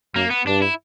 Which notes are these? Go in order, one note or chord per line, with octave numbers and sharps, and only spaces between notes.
F#2 A#3
B3
G2 D4
E4